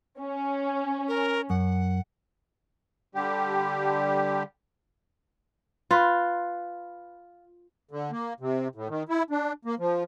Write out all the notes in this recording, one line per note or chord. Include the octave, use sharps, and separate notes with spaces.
C#4
A#4
F#2 F#5
D3 G3 G4
F4 B4
D3
A#3
C3
A2
D#3
E4
D4
A#3
F3